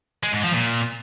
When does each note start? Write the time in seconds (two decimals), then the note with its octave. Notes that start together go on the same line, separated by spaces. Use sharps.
0.23 G#3
0.33 G#2
0.43 F3
0.53 A#2